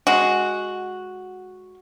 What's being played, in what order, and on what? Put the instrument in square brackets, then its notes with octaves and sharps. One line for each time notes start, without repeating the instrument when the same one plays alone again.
[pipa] G#3 F#4